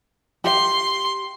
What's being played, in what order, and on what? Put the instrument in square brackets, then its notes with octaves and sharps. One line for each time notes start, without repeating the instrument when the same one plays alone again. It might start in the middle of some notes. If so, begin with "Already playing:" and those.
[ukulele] G4 F5 [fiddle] C6